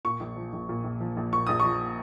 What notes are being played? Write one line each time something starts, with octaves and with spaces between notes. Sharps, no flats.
A#2 C#6
A#1
F3
A#1
A#2
A#1
F3
A#1
A#2 C#6
A#1 D#6
F3 C#6